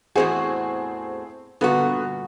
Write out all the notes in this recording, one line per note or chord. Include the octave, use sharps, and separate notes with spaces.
E2 A2 C4 F#4 G#4
G2 A#2 D3 B3 F#4